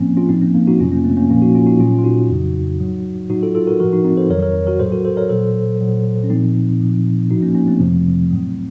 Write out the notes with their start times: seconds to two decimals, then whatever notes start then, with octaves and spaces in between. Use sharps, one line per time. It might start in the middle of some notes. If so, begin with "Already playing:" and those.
Already playing: A2 F3 A#3 C4 C#4
0.17 C#4 F4
0.29 A2 F3 C4 D#4
0.42 A#3 C#4
0.54 A#3
0.67 D#4 F#4
0.79 F2 C3 F#3 C#4 F4
0.92 A#3 C#4
1.04 A3 C4
1.17 A#3 C#4
1.30 A#2 F3 A#3 C#4
1.42 D#4 F#4
1.55 C#4 F4
1.67 D#4 F#4
1.80 A#2 F#3 C#4 F4
1.98 F4
2.04 D#4 F#4
2.30 F2 C#3 F#3
2.80 A2 F#3
3.30 A2 F#3 D#4 F#4
3.43 F4 A4
3.55 F4 A4
3.67 F#4 A#4
3.80 A2 F3 F#4 A#4
3.93 D#4 F#4
4.04 C4 D#4
4.17 A4 C5
4.30 F2 D#3 F#3 A#4 C#5
4.42 A#4 C#5
4.67 F#4 A#4
4.80 A2 F#3 A4 C5
4.92 F#4 A#4
5.05 A4 C5
5.17 A#4 C#5
5.30 A#2 F#3 A4 C5
5.81 A#2 F#3
6.24 C#4
6.30 A#2 F3 C4 D#4
6.80 A#2 F3
7.30 A2 F3 D#4 F#4
7.42 A#3 C#4
7.55 A#3 C#4
7.68 A3 C4
7.80 F2 C3 F3
8.31 A2 F#3